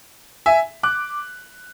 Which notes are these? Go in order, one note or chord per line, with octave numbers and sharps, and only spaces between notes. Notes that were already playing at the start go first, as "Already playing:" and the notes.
E5 G#5
D6 F#6